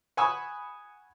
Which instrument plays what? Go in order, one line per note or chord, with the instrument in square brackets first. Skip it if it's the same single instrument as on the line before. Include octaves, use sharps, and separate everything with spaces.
[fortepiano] F#5 G#5 B5 C#6 D#6 E6